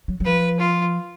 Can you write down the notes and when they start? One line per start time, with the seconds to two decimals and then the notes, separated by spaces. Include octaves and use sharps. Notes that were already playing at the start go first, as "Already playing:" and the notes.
0.08 F#3
0.20 F#3
0.25 F3 B4
0.60 F4